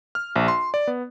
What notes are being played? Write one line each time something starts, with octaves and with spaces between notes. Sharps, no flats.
F6
A#1
C6
D5
B3